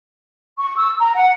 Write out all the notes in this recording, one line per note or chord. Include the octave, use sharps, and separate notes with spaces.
C#6
E6
A#5
F#5